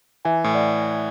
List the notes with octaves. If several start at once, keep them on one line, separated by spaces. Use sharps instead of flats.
E3 E5 G#5
A2
D5 F#5